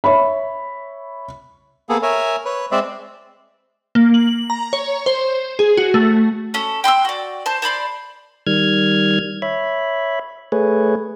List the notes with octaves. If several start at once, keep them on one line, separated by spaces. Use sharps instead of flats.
C#5 E5 B5
A#3 B3 G#4 A4
A#4 C#5 E5 G#5
B4 C#5
G#3 C4 C5 D5 E5
A#3
F#7
A#5
C#5
C5
G#4
F#4
A3
C#4 A4
G5 C6 D6 E6
F#4 D5
C5 A5
C5 D5 B5 C6
D#3 G3 F6 G#6
C#5 E5 B5
A3 G#4 B4 C#5